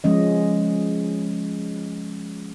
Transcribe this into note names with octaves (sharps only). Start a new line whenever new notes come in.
F3 G#3 C#4 D#5